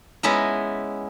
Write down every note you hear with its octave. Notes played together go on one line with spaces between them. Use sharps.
G#3 B3 C#4 E4 D#5 A#5